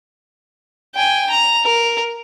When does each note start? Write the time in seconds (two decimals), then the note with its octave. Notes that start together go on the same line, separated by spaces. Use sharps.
0.95 G5 G#5
1.30 A#5
1.65 A#4